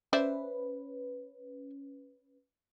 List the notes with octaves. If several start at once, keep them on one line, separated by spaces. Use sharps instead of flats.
C#4 B4 C5 D5 E5